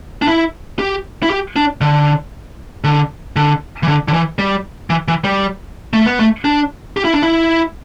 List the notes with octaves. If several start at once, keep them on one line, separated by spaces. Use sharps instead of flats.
D4
E4
G4
E4
G4
D4
D3
D3
D3
E3
D3
D3
E3
G3
E3
E3
G3
A3
B3
A3
D4
G4
E4
D4
E4